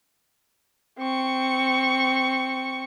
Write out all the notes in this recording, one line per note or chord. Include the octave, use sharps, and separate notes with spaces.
C4 C#6